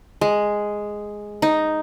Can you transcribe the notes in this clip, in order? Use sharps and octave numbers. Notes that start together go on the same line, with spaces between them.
G#3
D#4